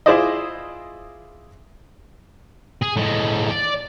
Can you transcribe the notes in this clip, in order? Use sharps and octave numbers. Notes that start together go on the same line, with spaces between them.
E4 F4 G#4 C5 D5 D#5
G#4
A2 G#3
D5